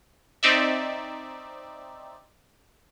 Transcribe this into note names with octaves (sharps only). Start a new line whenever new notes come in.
C4 D#4 D5 E5